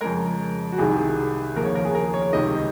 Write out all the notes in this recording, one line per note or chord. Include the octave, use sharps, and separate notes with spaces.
F2 C#3 G#3 A#4
F#4
C2 C3 D#3 G#4
D#2 C#3 F3 A#3 A#4
C#5
A#4
G#4
A#4
C#5
C#2 C3 D#3 D#5